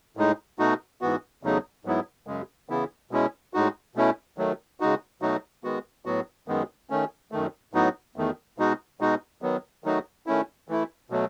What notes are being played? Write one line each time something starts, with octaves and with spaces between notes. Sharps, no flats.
A2 G#3 D#4
B2 A3 D#4 F#4
G#2 E3 B3 F#4
E2 C#3 F#3 A3 D#4
G#2 F#3 B3 E4
F#2 C#3 G#3
C#3 E3 B3 E4
B2 G#3 C#4 E4
A2 G#3 D#4 F#4
B2 A3 C#4 E4
D#3 F#3 A3
C#3 G#3 D#4 F#4
B2 F#3 A3 D#4 F#4
D#3 G#3 B3 F#4
A2 F#3 B3 F#4
F#2 D#3 G#3 B3
D#3 A3 C#4
F#2 D#3 A3
A2 F#3 B3 D#4 F#4
E2 D#3 A3
B2 G#3 D#4 F#4
B2 G#3 D#4 F#4
D#3 F#3 B3
D#3 F#3 A3 D#4 F#4
D#3 A3 C#4 E4
E3 A3 E4
B2 F#3 A3